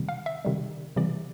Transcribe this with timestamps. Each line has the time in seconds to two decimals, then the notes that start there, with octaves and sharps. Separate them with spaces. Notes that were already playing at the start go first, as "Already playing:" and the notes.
Already playing: C3 D#3 G3
0.09 F5
0.26 E5
0.45 C3 D#3 G3
0.96 C3 E3 G3 D5